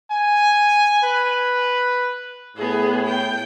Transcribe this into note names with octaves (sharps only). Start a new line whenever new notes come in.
G#5
B4
A2 B3 G#4
G5